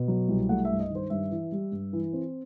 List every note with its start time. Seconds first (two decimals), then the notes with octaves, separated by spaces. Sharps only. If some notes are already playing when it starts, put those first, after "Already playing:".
Already playing: B2
0.08 F#3
0.29 C2
0.49 A3 F#5
0.65 G2 E5
0.80 D#5
0.90 D#3
0.95 C5
1.10 G2 E5
1.31 E3
1.52 G3
1.72 G2
1.93 E3
2.13 C4